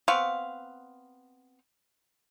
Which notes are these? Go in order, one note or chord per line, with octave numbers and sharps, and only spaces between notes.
B3 C4 F5 C#6